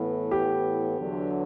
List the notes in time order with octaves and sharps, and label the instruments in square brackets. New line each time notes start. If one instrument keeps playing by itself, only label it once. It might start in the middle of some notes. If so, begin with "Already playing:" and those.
Already playing: [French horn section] A2 E3 B3
[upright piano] G4
[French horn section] E2 D3 F#3